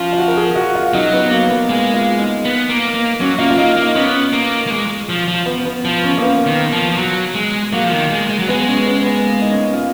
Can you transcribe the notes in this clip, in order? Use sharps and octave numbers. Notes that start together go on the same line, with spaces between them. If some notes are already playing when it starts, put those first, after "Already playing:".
Already playing: F3 C#4 F4
F4
F#4
A#4
G#4
F#4
F4
F#3 D#4
B3
A#3
B3
G#3 A#3
F4
D#4
B3
A#3
A#3
F#3 C#4
A#3 F4
F4
A#3 D#4
A#3 D#4
B3 C#4
A#3
A#3
G#3
F3
F3
B3
B3
F3
C#4
A#3
B3
D#3
F3
F3
F#3
G#3
F#3 A#3
F3
D#3
G#3
G#3
F#3
G#3 B3
C#4
B3
B3
A#3
D#4
C#4
F4